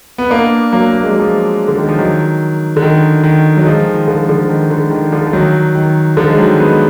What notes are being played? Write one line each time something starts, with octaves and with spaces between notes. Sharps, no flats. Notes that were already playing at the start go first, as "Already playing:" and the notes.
B3
A#3 D4
F#3 A#3
A#3
G#3
F#3
F3 G#3
D3
D#3
F3
D#3 F#3
D3
D#3
D#3
F#3
F3 G#3
D#3
D3 F3
D3 F3
D#3
D3
D#3
D3 F3
F3
D#3 F#3
D#3
D3 F3
G#3
D#3 F#3
G#3 B3